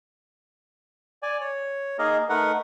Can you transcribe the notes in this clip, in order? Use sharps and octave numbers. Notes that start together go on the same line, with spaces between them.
D5 G#5
C#5
A#3 D#4 G#4 A#4 D#5 F5
A3 D#4 A#4 B4 F#5